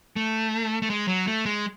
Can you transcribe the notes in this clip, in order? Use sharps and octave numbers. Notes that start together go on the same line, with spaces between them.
A3
A3
G#3
F#3
A3
G#3